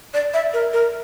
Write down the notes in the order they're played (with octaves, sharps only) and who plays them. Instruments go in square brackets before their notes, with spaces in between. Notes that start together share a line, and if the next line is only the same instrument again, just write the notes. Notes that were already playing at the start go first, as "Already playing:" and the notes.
[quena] D5
E5
A#4
A#4